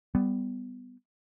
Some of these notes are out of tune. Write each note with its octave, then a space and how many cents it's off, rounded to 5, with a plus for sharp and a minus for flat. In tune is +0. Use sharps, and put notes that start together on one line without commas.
G3 +0 B3 +15